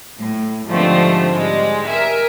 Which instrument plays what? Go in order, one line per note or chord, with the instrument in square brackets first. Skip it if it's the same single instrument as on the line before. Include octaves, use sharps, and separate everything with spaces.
[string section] A2
G#2 D3 F3 G3 A3 C4
G#2 G3 G#3
A#4 E5 G#5